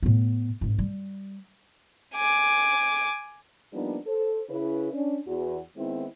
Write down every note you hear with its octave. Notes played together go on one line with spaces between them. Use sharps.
A2 B3
A1 G#2
G3
G#5 D6
F3 G3 A#3 B3 D4 D#4
A4 C5
C#3 E4 B4
C#4 D4
E2 F#4
D#3 G#3 B3 C4 E4